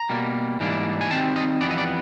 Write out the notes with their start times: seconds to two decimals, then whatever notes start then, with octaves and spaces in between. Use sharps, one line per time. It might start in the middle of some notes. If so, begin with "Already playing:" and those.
Already playing: A#5
0.09 B2 G3 A#3
0.60 G#2 E3 G3 A#3 D4
1.01 G#5
1.10 D#3 G3 C4 A5
1.36 D#5
1.61 F2 C#3 E3 G3 B3 D5
1.71 D#5
1.78 D5